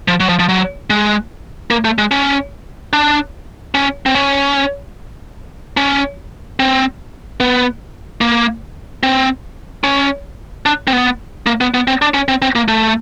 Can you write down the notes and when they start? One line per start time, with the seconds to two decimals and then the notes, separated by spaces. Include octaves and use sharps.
0.08 F3
0.20 F#3
0.29 F3
0.39 F3
0.49 F#3
0.90 G#3
1.71 A#3
1.85 A3
1.98 G#3
2.11 C#4
2.93 D4
3.75 C#4
4.06 C4
4.15 C#4
5.77 C#4
6.60 C4
7.40 B3
8.21 A#3
9.03 C4
9.84 C#4
10.66 D4
10.88 C4
10.93 B3
11.47 A#3
11.61 B3
11.74 B3
11.88 C4
12.02 D4
12.14 C#4
12.28 C4
12.42 C4
12.55 A#3
12.68 A3